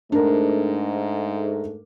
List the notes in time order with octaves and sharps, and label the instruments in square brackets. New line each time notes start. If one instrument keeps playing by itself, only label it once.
[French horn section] G#2 A3 [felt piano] D4 A#4